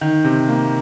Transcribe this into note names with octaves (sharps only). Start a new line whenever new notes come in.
D#3
C3
A#3